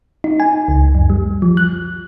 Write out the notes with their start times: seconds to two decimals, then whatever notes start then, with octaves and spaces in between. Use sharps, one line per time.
0.24 D#4
0.40 G#5
0.68 C#2
0.95 F#2
1.10 G3
1.42 F3
1.57 F#6